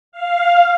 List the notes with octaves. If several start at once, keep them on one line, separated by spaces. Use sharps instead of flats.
F5